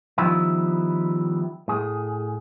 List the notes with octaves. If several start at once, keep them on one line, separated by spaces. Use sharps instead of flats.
D#3 F3 G3 B3 D#4 E4
A2 G#4